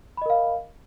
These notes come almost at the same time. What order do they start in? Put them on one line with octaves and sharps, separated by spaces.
B5 D#5 A#4 F5